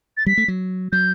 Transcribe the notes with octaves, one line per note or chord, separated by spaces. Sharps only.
A6
G3 B6
A3
F#3
F#3 G6